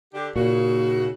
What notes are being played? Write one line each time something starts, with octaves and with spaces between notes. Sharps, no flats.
D3 D4 G4
D#2 A#2 C#3 F#4